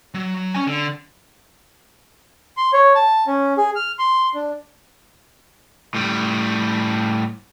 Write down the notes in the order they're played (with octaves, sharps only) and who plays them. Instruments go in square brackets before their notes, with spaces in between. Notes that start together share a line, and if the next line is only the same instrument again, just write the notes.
[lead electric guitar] F#3
C#4 G#5
D3
[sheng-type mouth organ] C6
C#5
A5
C#4
G#4
F6
C6
D4
[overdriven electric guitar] A2 G3